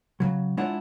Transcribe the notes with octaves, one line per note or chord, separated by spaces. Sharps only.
C#3 F#3
G#3 D4 E4 F4 C#5 F#5